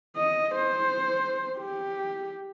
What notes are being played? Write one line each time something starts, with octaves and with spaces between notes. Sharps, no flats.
D#5
C5
G4